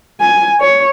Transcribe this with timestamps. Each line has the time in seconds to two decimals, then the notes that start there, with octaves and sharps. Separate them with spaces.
0.20 G#5
0.60 C#5